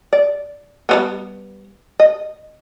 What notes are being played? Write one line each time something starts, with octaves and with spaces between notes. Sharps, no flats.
D5
G3 G#3 B3
D#5